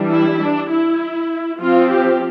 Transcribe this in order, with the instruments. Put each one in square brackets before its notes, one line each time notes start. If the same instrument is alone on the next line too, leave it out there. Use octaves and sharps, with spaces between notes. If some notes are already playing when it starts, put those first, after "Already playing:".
Already playing: [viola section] E3 G3 D4
E4
D4
E4
F3 C4 F4
G4